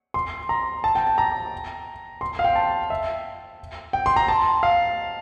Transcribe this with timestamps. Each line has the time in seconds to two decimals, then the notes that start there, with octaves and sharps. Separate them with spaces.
0.14 C6
0.49 A#5
0.84 A5
0.95 G5
1.07 A5
1.18 A#5
2.21 C6
2.39 F5
2.44 G5
2.55 A5
2.90 E5
3.93 G5
4.06 C6
4.16 A#5
4.28 A5
4.63 F5